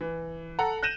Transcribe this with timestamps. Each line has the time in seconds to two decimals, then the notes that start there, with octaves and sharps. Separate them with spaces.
0.01 E3
0.59 A4 F#5 A#5
0.83 F#6 G6 A#6 D#7 E7 F#7